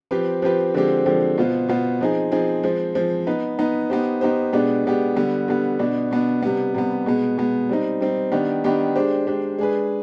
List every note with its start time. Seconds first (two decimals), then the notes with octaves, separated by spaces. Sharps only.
0.11 F3 C4 G4 B4
0.42 F3 C4 G4 B4
0.74 D3 F3 G#3 C4 G4
1.06 D3 F3 G#3 C4 G4
1.37 B2 B3 F4 C5
1.69 B2 B3 F4 C5
2.01 F3 C4 D#4 G#4
2.32 F3 C4 D#4 G#4
2.63 F3 G#3 C4
2.95 F3 G#3 C4
3.27 B3 D#4 B4
3.59 B3 D#4 B4
3.90 B3 D#4 G4 C5
4.21 B3 D#4 G4 C5
4.53 B2 G#3 B3 D4 G4
4.85 B2 G#3 B3 D4 G4
5.16 D3 G3 B3
5.48 D3 G3 B3
5.79 B2 B3 D4
6.11 B2 B3 D4
6.43 C3 G3 B3
6.74 C3 G3 B3
7.06 B2 G#3 B3
7.38 B2 G#3 B3
7.69 G3 C4 D#4
8.01 G3 C4 D#4
8.32 D#3 B3 D4 G4
8.64 D#3 B3 D4 G4
8.96 G#3 D4 G4 C5
9.27 G#3 D4 G4 C5
9.58 G#3 D4 G#4 B4